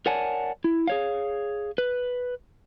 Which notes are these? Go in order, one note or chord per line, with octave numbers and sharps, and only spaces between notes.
A#4 C#5 D5 F#5 G#5 A5
E4
G#4 C#5 F5
B4